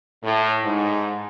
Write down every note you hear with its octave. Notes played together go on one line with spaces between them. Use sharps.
A2
G#2